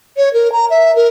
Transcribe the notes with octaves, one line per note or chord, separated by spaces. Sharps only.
C#5
A#4
A#5
E5
A#4